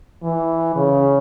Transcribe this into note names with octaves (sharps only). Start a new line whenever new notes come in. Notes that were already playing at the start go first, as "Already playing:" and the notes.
E3
C#3